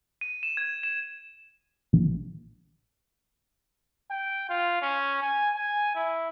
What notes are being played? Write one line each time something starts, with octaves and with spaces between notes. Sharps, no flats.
D#7
E7
G#6
E7
A#1
G5
F4
C#4
G#5
G#5
E4